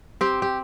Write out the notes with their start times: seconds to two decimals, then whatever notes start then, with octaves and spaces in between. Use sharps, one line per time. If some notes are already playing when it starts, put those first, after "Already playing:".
0.21 C4 G4
0.42 G4